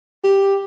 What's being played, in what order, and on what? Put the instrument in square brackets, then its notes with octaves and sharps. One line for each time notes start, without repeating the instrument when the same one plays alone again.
[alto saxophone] G4